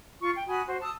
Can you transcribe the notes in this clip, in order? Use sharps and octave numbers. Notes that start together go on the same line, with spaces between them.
F4 C#6
G5
F#4 G#5 B5 D#6
F#4 C5
A5 D#6 E6